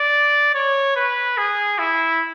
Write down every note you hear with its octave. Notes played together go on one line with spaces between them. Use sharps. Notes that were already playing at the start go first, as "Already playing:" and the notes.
Already playing: D5
C#5
B4
G#4
E4